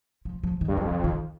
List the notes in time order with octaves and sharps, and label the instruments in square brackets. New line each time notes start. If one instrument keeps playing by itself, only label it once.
[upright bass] F3
F3
D#3
[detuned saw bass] G2
[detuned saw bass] F2 [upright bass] D#3
[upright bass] F3
D#3